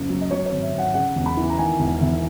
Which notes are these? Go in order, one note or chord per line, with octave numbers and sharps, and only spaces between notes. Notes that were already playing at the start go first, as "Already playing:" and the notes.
Already playing: F#1 C#2 C#3
F#3
D#5
F#3 C#5
C#5
G#1
E5
G#1
F#5
C#3 F#5
E1
B5
E3
A#5
D#3 G#5
E1
E1 E5